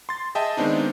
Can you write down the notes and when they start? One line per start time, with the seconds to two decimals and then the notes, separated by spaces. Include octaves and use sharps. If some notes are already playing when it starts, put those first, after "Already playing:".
0.09 C6 A6
0.35 G#4 D#5 E5 G5 A5
0.57 D#3 G#3 B3 C4 D4 D#4